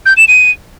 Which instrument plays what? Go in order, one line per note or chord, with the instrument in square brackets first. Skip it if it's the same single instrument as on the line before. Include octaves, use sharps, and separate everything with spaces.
[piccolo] G6
E7
D#7